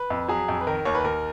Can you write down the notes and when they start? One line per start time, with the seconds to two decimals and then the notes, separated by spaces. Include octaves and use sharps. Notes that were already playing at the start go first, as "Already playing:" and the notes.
Already playing: B4
0.10 F2
0.29 F#3 G#4
0.49 F2
0.61 B4
0.67 D#3 A#4
0.85 D#2 C#5
0.95 B4
1.04 D#2 A#4